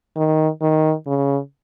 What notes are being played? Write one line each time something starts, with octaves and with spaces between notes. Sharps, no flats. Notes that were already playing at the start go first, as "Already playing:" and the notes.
D#3
D#3
C#3